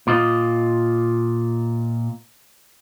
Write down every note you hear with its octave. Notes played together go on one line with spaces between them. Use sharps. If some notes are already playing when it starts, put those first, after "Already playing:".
A#2 F4 D#5